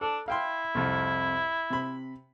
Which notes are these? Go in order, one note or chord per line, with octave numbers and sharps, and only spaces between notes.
D4 A4
E4 F5 G5 C6
C2 F2
C3 B5